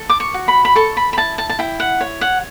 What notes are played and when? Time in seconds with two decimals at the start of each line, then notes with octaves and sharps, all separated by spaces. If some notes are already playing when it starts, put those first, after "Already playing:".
Already playing: A4
0.10 D6
0.20 C#6
0.34 F#4
0.48 B5
0.65 B5
0.76 A4 C#6
0.97 B5
1.13 B5
1.17 E4 A5
1.38 A5
1.49 A5
1.59 E4 G5
1.80 F#5
2.01 C#5
2.21 F#5